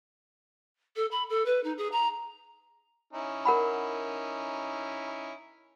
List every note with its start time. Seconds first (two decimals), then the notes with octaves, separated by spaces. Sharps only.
0.96 A4
1.11 B5
1.29 A4
1.45 B4
1.63 D#4
1.77 G#4
1.92 A#5
3.13 C#4 D#4 E4
3.45 A#4 F#5 B5